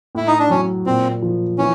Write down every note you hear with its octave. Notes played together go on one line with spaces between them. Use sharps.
A2 E4
D#4
D4
F#3 C#4
A#2 C4
F3
E3 C#4